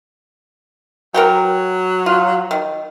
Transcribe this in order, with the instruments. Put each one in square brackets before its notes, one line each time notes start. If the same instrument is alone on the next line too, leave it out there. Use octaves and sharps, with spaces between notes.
[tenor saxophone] F#3 [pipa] A#4 F#5 G5
[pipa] F4
D#3